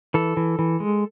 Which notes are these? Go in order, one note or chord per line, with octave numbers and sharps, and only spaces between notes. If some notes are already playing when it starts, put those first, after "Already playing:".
E3 A4
E3
E3
G#3